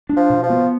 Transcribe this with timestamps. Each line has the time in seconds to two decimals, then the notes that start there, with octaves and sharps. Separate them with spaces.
0.09 D4
0.16 F3
0.30 B2
0.43 F3
0.50 B3